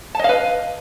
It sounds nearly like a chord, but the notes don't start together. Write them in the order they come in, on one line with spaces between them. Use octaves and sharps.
A5 D#5 F5 B4